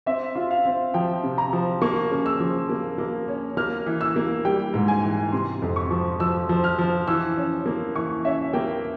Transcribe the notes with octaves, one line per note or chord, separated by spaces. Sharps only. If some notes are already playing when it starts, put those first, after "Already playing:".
C4 E5
F4
F5
C4
F3 G5
C3
A#5
F3
A#3 C#6
C#3
E6
F3
A#3
A#3
C#4
A#3 F6
E3
E6
A#3
G3 G5
G#2
G#5
E3
C3 C6
F2
C#6
F3
F3 E6
F3
F6
F3
E3 E6
C#4
A#3
E3 C#6
C#4 E5
A#3 G5